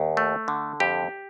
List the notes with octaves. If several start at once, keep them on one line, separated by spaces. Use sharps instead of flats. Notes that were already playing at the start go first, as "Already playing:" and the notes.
Already playing: D#2
A3
D3
F2 G4